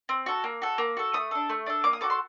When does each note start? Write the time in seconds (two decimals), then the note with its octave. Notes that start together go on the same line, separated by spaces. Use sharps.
0.09 C4
0.26 F#4 A4
0.44 A#3
0.62 F#4 A4
0.78 A#3
0.97 F#4 A4
1.14 A3 D#6
1.31 D4 A4
1.49 A3
1.66 D4 A4
1.84 A#3 D6
1.93 D#6
2.01 F#4 A4 D6
2.10 C6